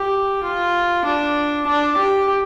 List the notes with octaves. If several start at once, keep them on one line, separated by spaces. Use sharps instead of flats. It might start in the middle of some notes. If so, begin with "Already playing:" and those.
Already playing: G4
F4
D4
D4
G4